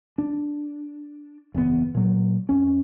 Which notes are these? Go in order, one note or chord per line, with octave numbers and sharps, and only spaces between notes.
D4
F#1 E2 A#2 B3
A#2 F#3
F2 C#4